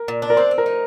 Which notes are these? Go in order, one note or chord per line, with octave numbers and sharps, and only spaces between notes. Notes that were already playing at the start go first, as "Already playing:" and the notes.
Already playing: A#4
A#2
D4
A#4
C4 C5
C4
A#4
D#4